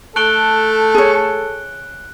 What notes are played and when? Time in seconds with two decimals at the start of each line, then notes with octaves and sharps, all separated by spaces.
0.16 A3 A4 F#6 D7 G7
0.95 G#4 C#5